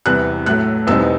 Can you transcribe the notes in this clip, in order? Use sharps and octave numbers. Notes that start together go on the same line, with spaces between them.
E2 C3 E3 G3 F#6
A2 F#3 A3 F#6
E2 B2 G3 C4 D#4 E6